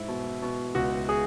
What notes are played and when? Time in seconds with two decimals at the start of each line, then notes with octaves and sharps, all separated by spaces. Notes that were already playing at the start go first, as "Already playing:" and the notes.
Already playing: G#2 E4
0.08 B2
0.42 B2
0.75 C#2 F#4
1.09 G#4